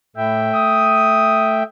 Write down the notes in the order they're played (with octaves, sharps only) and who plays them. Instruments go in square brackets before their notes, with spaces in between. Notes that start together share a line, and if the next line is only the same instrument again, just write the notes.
[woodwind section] A2 [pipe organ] A3 E5 G5
[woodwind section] D#6